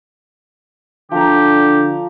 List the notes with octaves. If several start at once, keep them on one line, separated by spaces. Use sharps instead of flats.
D3 F3 G4 A#5